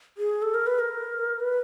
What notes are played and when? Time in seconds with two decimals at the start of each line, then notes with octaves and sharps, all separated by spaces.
0.18 G#4
0.42 A4
0.54 A#4
0.67 B4
0.79 A#4
1.40 B4